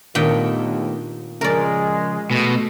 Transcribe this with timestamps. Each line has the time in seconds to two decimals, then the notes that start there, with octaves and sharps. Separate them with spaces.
0.15 D#2 A#2 D#3 A3 B3 D4 G5
1.41 C#3 F3 G#3 A#4 D5
2.31 B2 A3